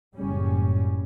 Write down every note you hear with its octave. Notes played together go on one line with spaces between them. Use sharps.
F#1 A2 C#3 G3 C#4